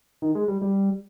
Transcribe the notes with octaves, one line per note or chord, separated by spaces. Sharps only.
D#3
G#3
G3
G3